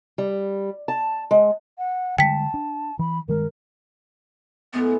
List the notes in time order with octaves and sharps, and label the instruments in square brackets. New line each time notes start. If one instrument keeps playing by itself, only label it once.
[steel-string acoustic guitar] G3
A5
G#3
[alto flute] F#5
[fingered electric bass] D3 G3 G#3 [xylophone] G5 B6 [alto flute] A5
[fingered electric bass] D4
[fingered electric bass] E3 [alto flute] B5
[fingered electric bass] G2 D#3 G#3 [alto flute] A#4
[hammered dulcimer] A2 G#3 B4 [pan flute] B3